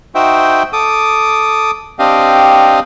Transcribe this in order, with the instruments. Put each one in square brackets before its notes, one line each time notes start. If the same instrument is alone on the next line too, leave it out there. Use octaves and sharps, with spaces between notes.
[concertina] D#4 F#4 C5 E5 G5
A4 D6 D#6
C4 D4 G4 D#5 F5